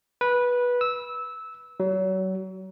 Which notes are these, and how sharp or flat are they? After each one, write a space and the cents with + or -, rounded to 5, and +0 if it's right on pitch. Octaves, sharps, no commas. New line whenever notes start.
B4 -15
E6 -15
F#3 +35